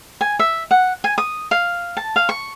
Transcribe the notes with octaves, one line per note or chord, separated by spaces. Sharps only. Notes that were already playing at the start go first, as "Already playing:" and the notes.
G#5
E5
F#5
G#5
D#6
F5
A5
F5
C#6